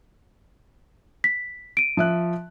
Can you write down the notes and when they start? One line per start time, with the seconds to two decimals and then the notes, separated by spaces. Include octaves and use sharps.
1.24 B6
1.77 D7 D#7
1.97 F3 E5 F#6